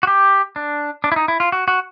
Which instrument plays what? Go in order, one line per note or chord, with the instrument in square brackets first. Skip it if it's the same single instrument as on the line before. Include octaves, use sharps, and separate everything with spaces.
[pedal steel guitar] F#4
G4
D4
D4
E4
D#4
E4
F4
F#4
F#4